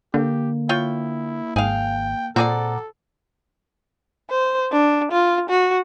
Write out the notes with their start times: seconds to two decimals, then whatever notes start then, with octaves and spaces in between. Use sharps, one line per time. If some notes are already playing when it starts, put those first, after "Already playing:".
0.14 D3 A#3 G4
0.69 E4 F4 C#5 G5
1.56 G#1 G#4 F5 G5
2.36 A#2 C4 G#4 A4 D5 F#5 A#5 D6
4.30 C5
4.72 D4
5.12 F4
5.49 F#4